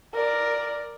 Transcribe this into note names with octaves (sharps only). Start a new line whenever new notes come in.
A#4 D5